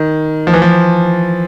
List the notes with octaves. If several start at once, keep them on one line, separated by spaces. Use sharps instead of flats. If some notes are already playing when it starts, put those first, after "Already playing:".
Already playing: D#3
F3
E3
F3